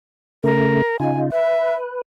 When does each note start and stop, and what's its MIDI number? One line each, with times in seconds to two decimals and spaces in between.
0.44 0.82 49
0.44 0.82 57
0.44 0.97 70
1.00 1.30 49
1.00 1.30 63
1.00 1.30 65
1.00 1.19 80
1.32 2.01 71
1.32 1.75 76